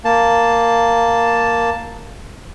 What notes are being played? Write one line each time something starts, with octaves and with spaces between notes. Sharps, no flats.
A#3 A5